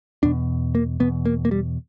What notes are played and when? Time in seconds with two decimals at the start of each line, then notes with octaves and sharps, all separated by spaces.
0.23 E2 B2 D4
0.75 A#3
1.00 E2 B2 B3
1.25 A#3
1.45 A#3
1.51 G3